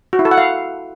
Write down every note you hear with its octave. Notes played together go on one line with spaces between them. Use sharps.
F#4
E4
A4
F#5
F5